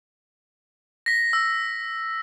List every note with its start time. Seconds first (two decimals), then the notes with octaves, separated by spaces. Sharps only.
1.06 A#6 B6
1.33 E6